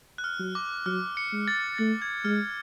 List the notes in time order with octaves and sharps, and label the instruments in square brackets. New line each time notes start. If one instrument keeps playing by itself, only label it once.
[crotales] F#6
F6
[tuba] F#3
[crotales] D6
[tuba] F#3 [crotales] F6
[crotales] C#7
[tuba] G#3
[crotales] A6
[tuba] A3 [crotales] A6
[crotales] G#6
[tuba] G#3 [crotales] F6